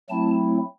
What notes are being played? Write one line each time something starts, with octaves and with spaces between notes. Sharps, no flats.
F#3 A3 C4 E4 A5